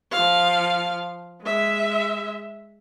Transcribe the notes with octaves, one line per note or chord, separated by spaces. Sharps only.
F3 F5
G#3 E5